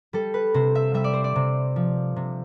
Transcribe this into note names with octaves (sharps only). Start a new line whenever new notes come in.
G3 A4
B4
C3 C5
E5
G3 E5
D5
C5
D5
C3
F3
C3